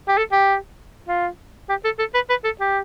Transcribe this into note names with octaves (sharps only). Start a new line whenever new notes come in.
G4
A4
G4
F4
G4
A4
A4
B4
B4
A4
G4